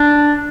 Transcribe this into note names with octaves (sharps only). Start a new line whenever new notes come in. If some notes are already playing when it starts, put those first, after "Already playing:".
Already playing: D4